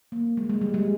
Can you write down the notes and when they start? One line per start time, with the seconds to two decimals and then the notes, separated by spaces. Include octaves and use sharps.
0.12 A#3
0.37 G#3
0.50 G#3
0.61 G3
0.74 G#3